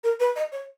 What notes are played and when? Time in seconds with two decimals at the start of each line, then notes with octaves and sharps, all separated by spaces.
0.04 A#4
0.20 B4
0.36 D#5
0.52 C#5